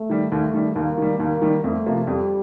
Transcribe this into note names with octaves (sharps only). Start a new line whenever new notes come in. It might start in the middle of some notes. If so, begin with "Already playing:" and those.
Already playing: A3
D#3 G3
D#2 A3
D#3 G3
D#2 A#3
D#3 G3
D#2 A#3
D#3 G3
F2 A3
C3 F3 A#3 F4
F2 G3